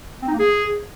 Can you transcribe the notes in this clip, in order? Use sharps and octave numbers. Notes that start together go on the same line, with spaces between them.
C4
D#4
A#3
G#4